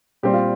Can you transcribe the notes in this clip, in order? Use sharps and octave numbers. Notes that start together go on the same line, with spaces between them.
A#2 G3 C4 G4
F4